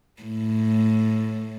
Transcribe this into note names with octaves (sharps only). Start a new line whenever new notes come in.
A2